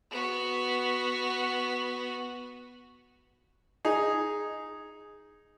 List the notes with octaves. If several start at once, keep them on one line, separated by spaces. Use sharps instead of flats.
B3 F#4
D#4 G#4